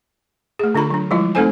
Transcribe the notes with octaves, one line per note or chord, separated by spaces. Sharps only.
A3 G#4
D3 D4 F4 A#5 B5
F#3 D4
F3 G3 G#3 E4 F4
A3 C4 D#4 A4 C5 G#5